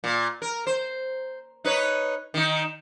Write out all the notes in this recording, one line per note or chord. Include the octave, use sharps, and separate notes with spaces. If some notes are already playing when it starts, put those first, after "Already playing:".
A#2
A#4
C5
D#4 B4 C#5
D#3 D#4